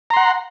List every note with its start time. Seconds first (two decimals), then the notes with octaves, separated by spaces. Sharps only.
0.10 A#5
0.14 C6
0.17 F#5